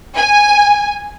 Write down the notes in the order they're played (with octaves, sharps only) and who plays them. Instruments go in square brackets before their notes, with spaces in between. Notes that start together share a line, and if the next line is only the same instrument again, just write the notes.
[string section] G#5